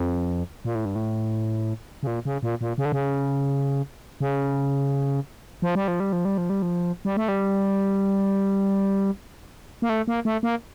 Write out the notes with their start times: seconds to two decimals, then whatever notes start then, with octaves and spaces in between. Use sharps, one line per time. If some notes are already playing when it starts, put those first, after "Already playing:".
Already playing: F2
0.65 A#2
0.75 A2
0.85 G2
0.95 A2
2.03 C#3
2.07 A#2
2.25 C#3
2.43 A#2
2.61 A#2
2.78 C#3
2.85 D3
2.92 C#3
4.20 C#3
5.62 F3
5.75 G3
5.88 F3
6.00 G3
6.13 F3
6.25 G3
6.38 F3
6.50 G3
6.62 F3
7.05 G3
7.17 A3
7.28 G3
9.82 A#3
9.89 A3
10.08 A#3
10.25 A3
10.43 A#3